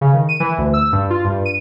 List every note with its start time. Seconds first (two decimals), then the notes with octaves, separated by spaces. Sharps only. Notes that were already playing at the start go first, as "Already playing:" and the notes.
0.01 C#3
0.14 D#3
0.29 D#7
0.40 E3
0.58 D2
0.74 E6
0.92 G2
1.10 F4
1.24 G2
1.45 D#7